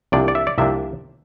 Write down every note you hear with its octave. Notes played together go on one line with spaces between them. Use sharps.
C2 C3 F3 A#3 D4 D5
D5
E5
D5
C2 C3 F3 A#3 D4 E5